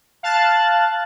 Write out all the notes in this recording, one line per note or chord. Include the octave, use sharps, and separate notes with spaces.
F5 A5 F#6 A6